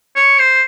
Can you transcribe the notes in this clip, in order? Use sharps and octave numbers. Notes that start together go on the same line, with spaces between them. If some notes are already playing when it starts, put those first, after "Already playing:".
C#5
C5